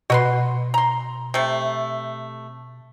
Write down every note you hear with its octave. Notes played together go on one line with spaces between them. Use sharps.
B2 F#4 B4 C6
A#5 C6
C3 A3